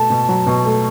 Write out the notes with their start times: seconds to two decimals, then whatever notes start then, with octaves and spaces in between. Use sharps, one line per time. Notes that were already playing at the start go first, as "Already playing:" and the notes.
Already playing: B2 A3 A5
0.10 B2
0.29 F#3
0.47 B2
0.65 A3